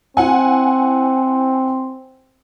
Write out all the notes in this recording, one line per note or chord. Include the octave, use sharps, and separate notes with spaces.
C4 E4 F#5 G#5